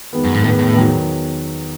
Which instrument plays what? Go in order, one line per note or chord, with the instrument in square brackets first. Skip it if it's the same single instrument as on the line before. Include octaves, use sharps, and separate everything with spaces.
[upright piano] E2 D#3 G#3 B3
[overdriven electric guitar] F#2
G#2
[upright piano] E2 D#3 G#3 B3 [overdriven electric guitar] A2
[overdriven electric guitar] A2
[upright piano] E2 D#3 F#3